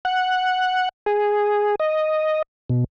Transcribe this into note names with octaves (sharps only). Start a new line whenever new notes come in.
F#5
G#4
D#5
B2